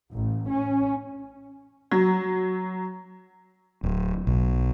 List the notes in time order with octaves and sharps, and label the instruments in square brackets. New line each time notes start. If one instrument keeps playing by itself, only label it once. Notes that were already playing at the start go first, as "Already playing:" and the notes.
[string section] A1
C#4
[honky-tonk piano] F#3
[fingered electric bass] D1
B1